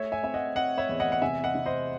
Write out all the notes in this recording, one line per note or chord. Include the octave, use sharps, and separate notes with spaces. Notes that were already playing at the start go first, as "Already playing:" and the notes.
Already playing: A3 C#5 E5
E5 G#5
C4 E5
D#5 F#5
C4 D#5 F#5
C#5 E5
E2
D#5 F#5
F#5
C3 E5 G#5
D#5 F#5
C3
C5 D#5